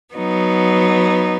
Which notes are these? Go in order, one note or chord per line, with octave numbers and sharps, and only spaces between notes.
F#3 B3 D#4